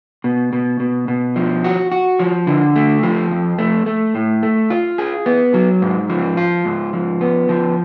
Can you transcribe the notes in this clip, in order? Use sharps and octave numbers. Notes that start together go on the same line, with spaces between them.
B2
B2
B2
B2
F3
F#4
F#4
F3
D3
A3
F3
F2
A3
A3
A2
A3
F4
G#4
B3
F#3
G#2
F3
F4
G#2
F3
B3
F3